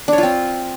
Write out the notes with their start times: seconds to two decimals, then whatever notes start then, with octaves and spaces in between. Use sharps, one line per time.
0.08 D4
0.13 C#5
0.18 F4
0.23 C4